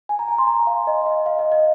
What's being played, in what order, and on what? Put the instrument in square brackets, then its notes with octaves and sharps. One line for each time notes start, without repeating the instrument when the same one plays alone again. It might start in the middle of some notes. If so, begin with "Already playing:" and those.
[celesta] G#5
A#5
G#5
C6
A#5
F5
D#5
D#5
F5
F5
D#5
D#5